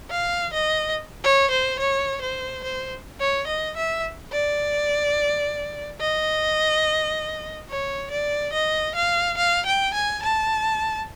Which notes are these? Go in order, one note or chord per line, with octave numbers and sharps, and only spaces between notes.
F5
D#5
C#5
C5
C#5
C5
C5
C#5
D#5
E5
D5
D#5
C#5
D5
D#5
F5
F5
G5
G#5
A5